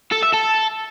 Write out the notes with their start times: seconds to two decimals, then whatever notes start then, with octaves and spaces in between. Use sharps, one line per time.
0.12 A4
0.23 E5
0.34 A4